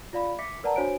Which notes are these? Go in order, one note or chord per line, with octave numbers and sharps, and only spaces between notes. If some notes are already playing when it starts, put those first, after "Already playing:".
F4 D5 F5 B5
E5 D6 B6 C#7
A#4 B4 D5 F#5 A5 A#5
D4 F#4 C5 C#5 G#5 D7